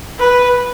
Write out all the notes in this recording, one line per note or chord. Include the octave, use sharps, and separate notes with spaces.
B4